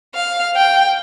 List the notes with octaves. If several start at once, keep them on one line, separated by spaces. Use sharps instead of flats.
F5
G5